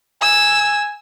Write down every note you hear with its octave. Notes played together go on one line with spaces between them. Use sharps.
G#5 E6